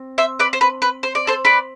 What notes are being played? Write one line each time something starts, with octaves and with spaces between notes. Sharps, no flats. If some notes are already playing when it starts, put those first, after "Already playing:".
Already playing: C4
C5 E5
B4 D5
C5
B4
B4
C5
D5
A4 C5
B4 D5